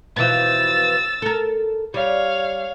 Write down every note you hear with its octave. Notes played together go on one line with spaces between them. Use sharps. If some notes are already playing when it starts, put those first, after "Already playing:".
B2 E3 F3 E6 A6
A4 A#4
G3 C#5 F5